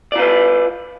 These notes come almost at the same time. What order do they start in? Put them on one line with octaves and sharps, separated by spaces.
D5 F4 B4